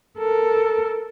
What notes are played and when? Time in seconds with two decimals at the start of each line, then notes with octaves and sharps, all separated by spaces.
0.19 A4 A#4